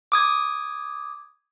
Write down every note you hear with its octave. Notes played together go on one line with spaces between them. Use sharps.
D6 D#6 G#6